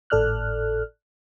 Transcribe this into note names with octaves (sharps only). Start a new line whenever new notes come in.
G#1 A2 A4 D5 F6 F#6